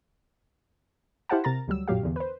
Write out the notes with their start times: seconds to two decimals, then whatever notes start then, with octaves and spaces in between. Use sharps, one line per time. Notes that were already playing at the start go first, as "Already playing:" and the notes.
1.29 E4 G4 C5 F5 F#5 A5
1.44 C3 A#4 A#5 A6
1.68 D2 F#3 G3 E6
1.88 A#1 F#2 A#2 F#3 G4 F5
2.03 E2 D3
2.16 B4 C5